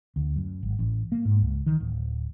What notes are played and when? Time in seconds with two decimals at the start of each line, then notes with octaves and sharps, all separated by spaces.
0.16 D2
0.36 F#2
0.63 G#1
0.79 A1
1.12 A#3
1.25 G#2
1.41 C#2
1.66 D#3
1.80 D1